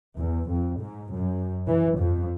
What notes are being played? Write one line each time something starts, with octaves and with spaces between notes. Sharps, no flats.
E2
F2
G#2
F#2
E3
F2